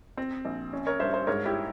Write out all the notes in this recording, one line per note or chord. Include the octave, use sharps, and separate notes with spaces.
C4
A#1
C#4
A#4 C#5
G2 C5 E5
C5 E5
G#2 A#4 C#5
E4 G4